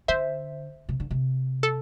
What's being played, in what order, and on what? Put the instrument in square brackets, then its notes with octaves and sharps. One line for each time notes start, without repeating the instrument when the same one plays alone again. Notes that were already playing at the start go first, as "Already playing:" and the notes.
[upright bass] D3 [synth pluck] C5 E5
[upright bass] C3
D3
C3
[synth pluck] A4